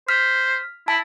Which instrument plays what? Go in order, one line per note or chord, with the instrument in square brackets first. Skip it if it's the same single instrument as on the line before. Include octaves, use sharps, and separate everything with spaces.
[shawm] C5 [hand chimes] F6 B6
[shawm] E4 [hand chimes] A5